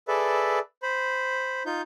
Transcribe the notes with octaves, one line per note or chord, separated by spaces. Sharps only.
G#4 A4 B4 D5 E5
C5 B5
D#4 F4 G6